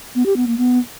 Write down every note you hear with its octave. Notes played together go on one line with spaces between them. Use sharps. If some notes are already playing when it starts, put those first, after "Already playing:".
B3
G4
B3
A#3
B3